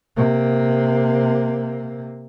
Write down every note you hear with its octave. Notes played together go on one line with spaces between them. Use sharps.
C3 A#3